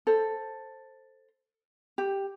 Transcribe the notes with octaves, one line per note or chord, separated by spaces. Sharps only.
A4 C5
G4